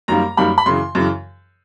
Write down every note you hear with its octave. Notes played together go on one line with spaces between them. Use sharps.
F#2 D#3 G3 A#3 A#5
F#2 D#3 G3 A#3 B5
B5
F#2 C#3 E3 C6
F#2 C#3 E3